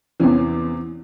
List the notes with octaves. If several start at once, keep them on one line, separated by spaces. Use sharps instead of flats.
E2 C3 E3 C#4